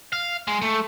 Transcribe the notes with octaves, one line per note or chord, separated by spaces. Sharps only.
F5
G#3
A3